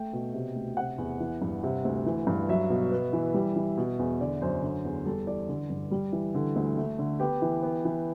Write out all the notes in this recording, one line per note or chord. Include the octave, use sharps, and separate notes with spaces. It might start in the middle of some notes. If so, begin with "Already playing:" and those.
Already playing: A3 G5
B2
C3
D2
C3 F#5
E2
E3
G2
C3
D2
E3
G2
F#3 E5
B2
B3
E3
G3
E3
B2
E2
D3 D5
F#2 C5
D3
E2
G3 A4
E3 D5
D3
G2
G3
E3
D3 A4
D2
A3
D3
B3 G4
E3
B3
E3